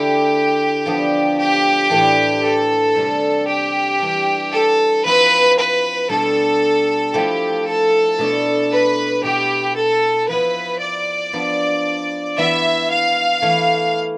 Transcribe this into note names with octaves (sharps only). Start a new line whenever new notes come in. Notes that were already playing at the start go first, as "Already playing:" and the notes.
Already playing: D3 A3 E4 G4
F3 B3 D4
G4
A2 E3 A3 D4
A4
C3 G3 D4
G4
E3 G3 D4
A4
F3 C4 E4 B4
B4
B2 G3 D4 A4
F3 A3 E4 G4
A4
B2 A3 D4
B4
B2 B3 E4 G4
A4
F3 B3 E4 B4
D5
F3 B3 D4
E3 B3 E4 E5
F5
E3 A3 E4